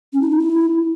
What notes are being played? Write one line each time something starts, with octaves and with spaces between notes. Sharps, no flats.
C#4
E4
D#4
E4